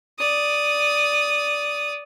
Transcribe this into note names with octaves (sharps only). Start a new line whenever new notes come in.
D5 D#6